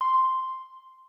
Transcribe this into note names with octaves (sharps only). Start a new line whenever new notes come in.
C6